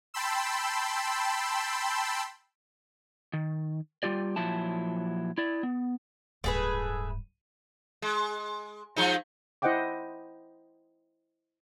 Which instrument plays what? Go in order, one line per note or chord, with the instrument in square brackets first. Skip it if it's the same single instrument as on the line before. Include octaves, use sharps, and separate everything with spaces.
[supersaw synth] G5 A5 B5 C6 E6
[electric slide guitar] D#3
G3 F4 G4 D5
A#2 F3 F#3 E4 A5
E4 D5
B3
[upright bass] D1 G2 [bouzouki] A3 G#4 B4
[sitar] G#3
F3 G#3 D#4
[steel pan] E4 C5 D#5 F#5 G5 D6